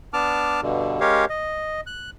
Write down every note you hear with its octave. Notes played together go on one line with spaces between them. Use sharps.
B3 D4 A5 D6 F6
G2 B2 D3
G#3 C#4 G4 A#4 C#5 F5
D#5
F#6